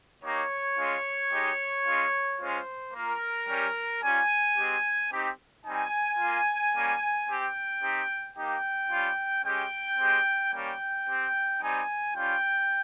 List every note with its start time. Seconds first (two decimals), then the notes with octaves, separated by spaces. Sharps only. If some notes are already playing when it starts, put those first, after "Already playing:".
0.23 A#3 D#4 G4 C#5
0.77 G#3 C#4 F4
1.31 G#3 D#4 G4
1.85 G#3 C#4 F4
2.40 G#3 C#4 F4 C5
2.94 A#3 F4 A#4
3.48 G3 C#4 G4
4.02 G3 C#4 F4 G#5
4.57 G#3 C4 G4
5.11 C4 D#4 G4
5.65 G3 C4 D#4 G#5
6.19 A#3 F4
6.73 G3 A#3 C#4
7.28 C4 G4 G5
7.81 C4 D#4 G4
8.36 A#3 D#4 G4 G5
8.90 G3 C#4 F4
9.44 G#3 C#4 G4 G5
9.99 G#3 C4 G4
10.53 G3 A#3 C#4 G5
11.07 C4 G4
11.61 G3 C4 D#4 G#5
12.15 G3 C#4 F4 G5